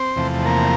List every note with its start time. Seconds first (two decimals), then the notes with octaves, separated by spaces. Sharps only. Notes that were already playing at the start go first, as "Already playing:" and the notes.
Already playing: C4 C5
0.16 E2 C3 F3 A3
0.46 A#3 A#4